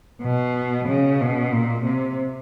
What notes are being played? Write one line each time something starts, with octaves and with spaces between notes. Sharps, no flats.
B2
C#3
B2
A#2
C3